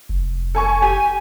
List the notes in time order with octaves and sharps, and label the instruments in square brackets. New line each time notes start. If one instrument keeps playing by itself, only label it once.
[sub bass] F1
[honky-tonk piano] A4 G#5 C#6
[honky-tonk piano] G4 [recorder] G#5